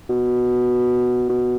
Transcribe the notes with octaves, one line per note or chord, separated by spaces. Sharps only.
B2
B2